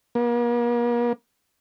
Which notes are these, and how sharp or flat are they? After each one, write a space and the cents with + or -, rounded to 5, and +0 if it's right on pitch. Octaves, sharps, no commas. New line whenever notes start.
A#3 +45